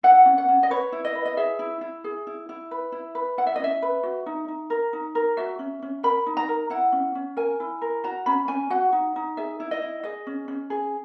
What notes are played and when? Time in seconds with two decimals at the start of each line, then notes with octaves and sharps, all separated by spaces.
0.03 E4 F#5
0.26 C#4
0.38 F#5
0.48 C#4
0.63 D#5
0.70 B4 C#5
0.92 E4
1.05 D#5
1.15 B4
1.25 D#5
1.37 G#4 E5
1.59 E4
1.81 E4
2.04 G#4
2.27 E4
2.49 E4
2.71 B4
2.92 E4
3.15 B4
3.38 E4 F#5
3.47 E5
3.56 D#5
3.59 C#4 E5
3.82 B4
4.03 F#4
4.26 D#4
4.48 D#4
4.70 A#4
4.93 D#4
5.15 A#4
5.37 F#4 E5
5.59 C#4
5.82 C#4
6.03 A#4 B5
6.26 D#4
6.37 A#5
6.49 A#4
6.70 E4 F#5
6.92 C#4
7.15 C#4
7.37 A#4 G#5
7.60 E4
7.82 A#4
8.04 F#4 A#5
8.26 C#4 B5
8.48 C#4 G#5
8.70 F#4 F#5
8.92 D#4
9.16 D#4
9.37 G#4 E5
9.60 E4
9.71 D#5
9.82 E4
10.04 G#4 D#5
10.27 C#4
10.48 C#4
10.70 G#4